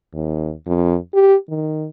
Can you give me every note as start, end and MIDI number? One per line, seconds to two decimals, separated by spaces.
0.13 0.52 39
0.67 0.96 41
1.14 1.35 67
1.49 1.87 51